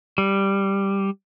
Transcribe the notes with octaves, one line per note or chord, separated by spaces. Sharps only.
G3